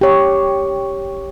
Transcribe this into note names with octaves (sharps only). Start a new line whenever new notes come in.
G4 C#5